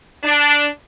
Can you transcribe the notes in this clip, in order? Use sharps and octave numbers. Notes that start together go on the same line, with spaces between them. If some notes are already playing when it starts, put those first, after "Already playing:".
D4